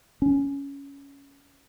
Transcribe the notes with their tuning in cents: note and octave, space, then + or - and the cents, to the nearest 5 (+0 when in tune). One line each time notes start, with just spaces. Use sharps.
C#4 +10